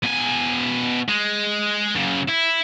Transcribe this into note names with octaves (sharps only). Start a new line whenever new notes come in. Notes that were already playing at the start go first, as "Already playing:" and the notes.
B2 G#5
G#3
F#2 C#3
E4